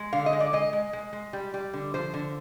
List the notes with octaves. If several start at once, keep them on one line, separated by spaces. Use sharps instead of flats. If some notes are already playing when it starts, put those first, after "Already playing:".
Already playing: G#3
D3 F5
D#5
G#3
D5
G#3 D#5
G#3
G#3
G#3
G3
G3
D3
F3 C5
D3